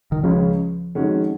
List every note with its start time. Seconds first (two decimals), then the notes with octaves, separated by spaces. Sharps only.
0.12 D#3
0.23 C#2 C#3 F3 G#3 C#4
0.95 F2 D#3 G#3 C#4 F#4